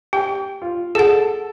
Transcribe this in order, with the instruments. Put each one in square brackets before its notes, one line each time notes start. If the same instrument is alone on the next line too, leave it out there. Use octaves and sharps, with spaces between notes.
[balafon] G4 [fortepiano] G5
[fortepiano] F4
[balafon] G#4 F#5 [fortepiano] A4 A5